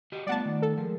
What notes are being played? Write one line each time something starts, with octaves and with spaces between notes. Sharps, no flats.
F#4 G4 D#5
G3 A3 B3 F4 D5 F#5 A5
D#3
A4
F3 G#3 G#4 A#4